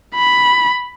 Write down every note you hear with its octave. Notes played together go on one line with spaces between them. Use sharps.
B5